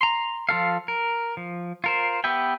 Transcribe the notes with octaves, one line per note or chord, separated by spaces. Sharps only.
A#5 C6
F3 F4 A4 F5
A#4
F3
F4 A#4 C5
B3 G4 B4 E5 G5